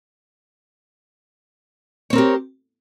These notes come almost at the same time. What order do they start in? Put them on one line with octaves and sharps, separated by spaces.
C#5 C4 A#4 G4